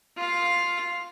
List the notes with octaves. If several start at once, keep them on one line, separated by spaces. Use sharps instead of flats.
F4 F5